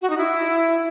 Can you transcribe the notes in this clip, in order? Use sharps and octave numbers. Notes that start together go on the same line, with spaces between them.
F#4
D#4
E4